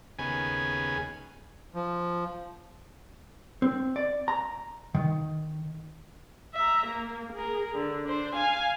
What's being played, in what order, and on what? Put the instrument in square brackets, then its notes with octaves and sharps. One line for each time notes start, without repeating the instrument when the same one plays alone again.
[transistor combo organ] D#2 C#3 B3 G#4 G#5
[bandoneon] F3
[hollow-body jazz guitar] C4
D5
A#5
D#3
[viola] E5 A#5
A#3
G#4 A#4
D3
D4 C5
F5 G#5